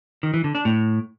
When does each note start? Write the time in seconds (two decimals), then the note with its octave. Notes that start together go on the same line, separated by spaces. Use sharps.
0.23 D#3
0.34 E3
0.44 D3
0.55 D4
0.65 A2